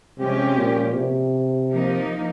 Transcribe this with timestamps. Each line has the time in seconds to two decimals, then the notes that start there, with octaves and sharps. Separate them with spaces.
0.18 C3 F3 G#3 C#4 G4
0.57 A#2
0.95 C3
1.71 F3 A#3 D#4